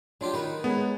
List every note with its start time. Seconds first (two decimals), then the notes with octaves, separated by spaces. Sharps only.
0.21 F3 F#3 D4 F4 G4
0.34 D#3 D#4 B4
0.64 G#3 B3 C#4 G#4